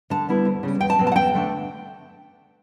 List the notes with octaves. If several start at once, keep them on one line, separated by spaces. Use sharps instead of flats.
D3 A5
G3 B3 E4
D2
C#3 G3
E2 G5
A5
B2 F#3
A5
F#5
E2 G5
D3 A3 D4